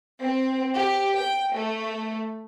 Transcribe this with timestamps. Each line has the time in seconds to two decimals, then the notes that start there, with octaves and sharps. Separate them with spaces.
0.22 C4
0.76 G4
1.18 G5
1.53 A3